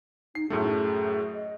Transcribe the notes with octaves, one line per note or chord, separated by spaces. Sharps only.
D#4 C7
F#2 A2 A3 G#4
D#5